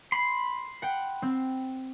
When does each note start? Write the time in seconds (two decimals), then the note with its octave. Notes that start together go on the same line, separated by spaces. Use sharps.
0.12 B5 C6
0.82 F#5 G5
1.22 C4